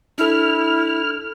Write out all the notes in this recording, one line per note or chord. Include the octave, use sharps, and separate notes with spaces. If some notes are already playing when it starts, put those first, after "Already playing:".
D4 E4 A4 F6